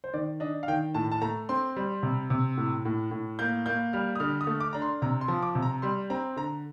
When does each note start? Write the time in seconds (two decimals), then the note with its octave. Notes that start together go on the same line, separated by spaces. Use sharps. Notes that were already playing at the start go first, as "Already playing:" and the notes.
0.04 C5
0.14 D#3 D5
0.40 D4 D#5
0.63 F5
0.68 D#3 G5
0.94 A2 A5
1.11 A5
1.21 A3 A#5
1.49 C4 C6
1.76 G3
2.03 C3
2.30 C3
2.57 A2
2.85 A2
3.11 A2
3.39 A#3 G6
3.66 A#3 G6
3.93 G3 F6
4.15 D#6
4.20 D3 F6
4.41 D#6
4.47 A3
4.60 D6
4.73 D4 A#5
4.82 C6
5.02 C3 A#5
5.21 C6
5.28 F3
5.42 D6
5.55 C3
5.62 A#5
5.82 G3 C6
6.10 C4 A#5
6.37 D3 A#5